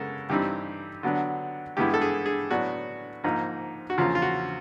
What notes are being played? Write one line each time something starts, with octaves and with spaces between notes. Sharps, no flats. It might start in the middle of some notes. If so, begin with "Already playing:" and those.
Already playing: F#2 C#3 G#3 B3 A4 A#4
G2 E3 G3 C4 D#4 G4
D3 F#3 B3 D4
G2 E3 G#3 B3 E4 G4
A4
G#4
G#4
A2 F#3 B3 D4 F#4
G#2 F3 A#3 D#4
F#4
E2 C#3 F3 A#3 F4
F4
F#4